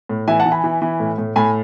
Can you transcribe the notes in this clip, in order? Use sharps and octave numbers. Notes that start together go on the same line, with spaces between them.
A2
E3 E5 G#5
F#5 A5
E3
G#5 B5
E3
E3
A2
A2
A2 G#5 B5